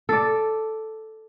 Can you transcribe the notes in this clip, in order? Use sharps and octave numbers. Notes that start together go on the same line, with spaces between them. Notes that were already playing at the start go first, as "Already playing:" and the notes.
A4 D5